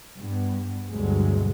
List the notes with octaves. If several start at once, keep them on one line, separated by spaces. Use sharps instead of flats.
G2 B3
D2 G2 B2 F#3 G#3